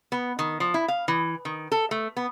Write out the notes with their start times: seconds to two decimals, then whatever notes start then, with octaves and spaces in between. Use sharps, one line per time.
0.12 B3
0.39 D#3
0.60 F3
0.74 E4
0.88 F5
1.08 E3
1.45 D#3
1.72 A4
1.91 A3
2.17 B3